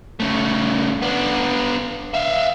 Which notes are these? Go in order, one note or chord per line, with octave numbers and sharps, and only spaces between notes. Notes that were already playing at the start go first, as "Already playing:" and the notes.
C#3 A3
B3 D4
E5 F5